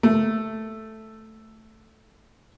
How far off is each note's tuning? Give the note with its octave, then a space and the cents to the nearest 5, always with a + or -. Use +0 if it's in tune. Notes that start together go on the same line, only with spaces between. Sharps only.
A3 +0